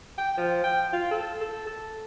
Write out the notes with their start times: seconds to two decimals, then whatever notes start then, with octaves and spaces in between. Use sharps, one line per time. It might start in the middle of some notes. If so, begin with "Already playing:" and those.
0.18 G5
0.37 F3
0.64 G5
0.93 F4
1.11 A4
1.41 A4
1.67 A4